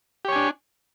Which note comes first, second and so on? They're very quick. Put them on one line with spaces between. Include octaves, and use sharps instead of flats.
G4 C#5 G#5 D4